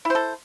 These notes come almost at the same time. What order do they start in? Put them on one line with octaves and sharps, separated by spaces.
E4 C5 A4